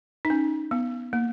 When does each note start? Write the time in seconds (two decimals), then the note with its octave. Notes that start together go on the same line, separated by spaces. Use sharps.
0.25 D#4
0.30 C#4
0.71 B3
1.13 A#3